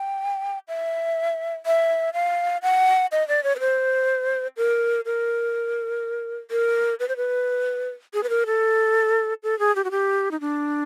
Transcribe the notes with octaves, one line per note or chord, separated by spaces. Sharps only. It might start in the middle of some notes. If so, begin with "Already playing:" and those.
Already playing: G5
E5
E5
F5
F#5
D#5
D5
C#5
B4
C5
A#4
A#4
A#4
B4
C5
B4
G#4
B4
A#4
A4
A4
G#4
G4
F#4
G4
D#4
D4